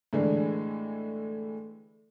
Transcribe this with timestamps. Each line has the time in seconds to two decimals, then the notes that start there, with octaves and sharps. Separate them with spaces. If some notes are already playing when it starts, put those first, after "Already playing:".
0.13 A2 D3 E3 G#3 D4